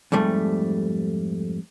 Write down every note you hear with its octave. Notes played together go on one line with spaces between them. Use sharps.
F2 G#2 G3 A3